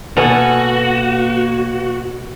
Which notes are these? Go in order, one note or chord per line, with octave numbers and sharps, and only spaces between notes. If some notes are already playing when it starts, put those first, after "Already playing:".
B2 A#3 F#4 A4 B4 G#5 F7